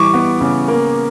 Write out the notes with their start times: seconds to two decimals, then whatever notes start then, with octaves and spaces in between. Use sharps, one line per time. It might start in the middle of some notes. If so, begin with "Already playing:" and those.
Already playing: E3 G3 C#6 D6
0.14 B3
0.41 C#3
0.68 A#3